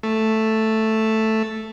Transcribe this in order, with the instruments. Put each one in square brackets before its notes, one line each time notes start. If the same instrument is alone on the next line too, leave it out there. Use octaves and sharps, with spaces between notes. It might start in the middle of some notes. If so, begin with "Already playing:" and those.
[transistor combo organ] A3